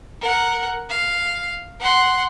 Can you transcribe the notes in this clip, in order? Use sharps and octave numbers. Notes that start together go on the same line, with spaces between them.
A#4 F#5
F5
F#5 C6